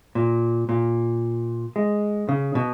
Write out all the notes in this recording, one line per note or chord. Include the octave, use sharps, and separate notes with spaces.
A#2
A#2
G#3
C#3
B2